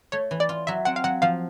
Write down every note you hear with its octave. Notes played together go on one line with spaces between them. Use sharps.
A3 C#5
E3
D5
F4
F#3 E5
C4 F#5
F5
F#3 F#5
F3 F5